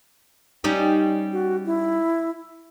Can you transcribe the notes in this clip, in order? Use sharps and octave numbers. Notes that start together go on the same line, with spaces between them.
G3 C#4 D#4 G5
F#4
E4